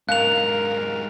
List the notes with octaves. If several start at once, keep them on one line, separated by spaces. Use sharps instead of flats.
G#2 D4 A#4 F5 F#6 F7